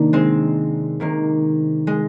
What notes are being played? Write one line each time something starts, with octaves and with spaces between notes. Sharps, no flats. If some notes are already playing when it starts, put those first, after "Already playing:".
Already playing: C3 D#3 A#3 D4
G#3 C4
C3 D#3 A#3
G#3